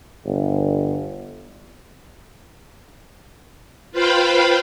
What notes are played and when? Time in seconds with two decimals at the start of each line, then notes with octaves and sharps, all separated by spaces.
0.25 G1
3.92 F4 B4 C5 F5 G5 B5